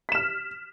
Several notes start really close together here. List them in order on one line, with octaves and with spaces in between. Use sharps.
B6 E7 F6